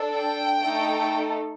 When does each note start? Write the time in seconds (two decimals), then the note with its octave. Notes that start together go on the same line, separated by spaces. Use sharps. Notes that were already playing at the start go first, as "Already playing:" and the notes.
Already playing: D4 A4
0.17 G5
0.61 A3 D#4 A4